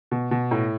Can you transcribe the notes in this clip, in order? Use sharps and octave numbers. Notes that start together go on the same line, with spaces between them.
B2
B2
A2